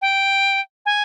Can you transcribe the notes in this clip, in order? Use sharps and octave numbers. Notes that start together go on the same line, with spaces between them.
G5
G#5